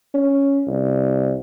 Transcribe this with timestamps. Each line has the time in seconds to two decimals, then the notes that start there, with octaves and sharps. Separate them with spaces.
0.14 C#4
0.67 C2